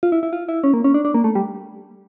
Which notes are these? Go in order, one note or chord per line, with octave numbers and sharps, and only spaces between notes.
F4
E4
E4
F4
E4
C#4
A#3
C#4
D4
D4
A#3
A3
G3